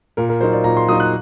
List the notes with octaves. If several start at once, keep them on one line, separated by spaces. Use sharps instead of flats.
A#2 A#4
A#4
F#3 A#3 D#4 C5
D5
A#2 A#5
C6
F#3 A#3 D#4 D#6
F#6